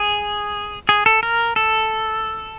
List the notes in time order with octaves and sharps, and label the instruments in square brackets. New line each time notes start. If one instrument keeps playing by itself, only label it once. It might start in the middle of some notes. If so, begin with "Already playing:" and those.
Already playing: [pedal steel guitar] G#4
G#4
A4
A#4
A4